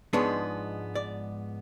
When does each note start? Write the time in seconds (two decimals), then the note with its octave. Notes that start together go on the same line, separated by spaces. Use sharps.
0.13 G#2 F3 G#3 B3 D4 C#5
0.95 D5